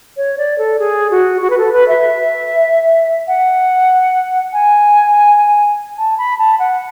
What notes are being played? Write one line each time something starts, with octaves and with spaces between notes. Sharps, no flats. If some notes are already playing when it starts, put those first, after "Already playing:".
C#5
D5
A4
G#4
F#4
F#4
B4
A4
B4
E5
F#5
G#5
A5
B5
A5
F#5